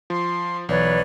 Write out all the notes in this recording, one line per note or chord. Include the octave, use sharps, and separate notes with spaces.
F3 C6
B1 E3 B4 C#5 D5